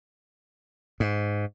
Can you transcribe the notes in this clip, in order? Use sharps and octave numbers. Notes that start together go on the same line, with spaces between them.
G#2